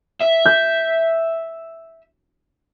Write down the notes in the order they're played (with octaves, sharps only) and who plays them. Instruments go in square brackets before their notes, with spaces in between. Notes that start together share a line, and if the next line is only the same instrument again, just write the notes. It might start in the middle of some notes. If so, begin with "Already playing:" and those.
[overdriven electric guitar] E5
[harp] G6